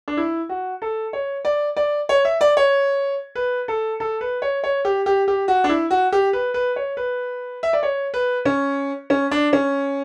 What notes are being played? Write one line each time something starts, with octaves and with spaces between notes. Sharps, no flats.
D4
E4
F#4
A4
C#5
D5
D5
C#5
E5
D5
C#5
B4
A4
A4
B4
C#5
C#5
G4
G4
G4
F#4
D4
E4
F#4
G4
B4
B4
C#5
B4
E5
D5
C#5
B4
C#4
C#4
D4
C#4